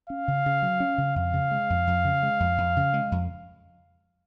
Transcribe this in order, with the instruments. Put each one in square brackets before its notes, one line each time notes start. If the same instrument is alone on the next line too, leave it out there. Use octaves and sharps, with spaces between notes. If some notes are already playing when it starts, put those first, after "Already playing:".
[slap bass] C#4 [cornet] F5
[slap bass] C#3
C#3
F#3
C#4
C#3
[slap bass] F2 [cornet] F5
[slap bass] C#3
G#3
F2
F2
C#3
G#3
F2
F2
C#3
G#3
F2